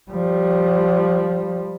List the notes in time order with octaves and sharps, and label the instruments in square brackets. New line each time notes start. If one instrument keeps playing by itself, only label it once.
[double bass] F3 G3